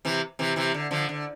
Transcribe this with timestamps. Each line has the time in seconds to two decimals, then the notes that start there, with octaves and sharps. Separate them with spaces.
0.05 C3 E3
0.39 C3 E3
0.56 C3 E3
0.74 D3
0.91 D3 F3
1.09 D3